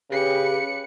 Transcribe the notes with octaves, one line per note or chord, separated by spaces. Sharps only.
C#3 G4 B4 C#7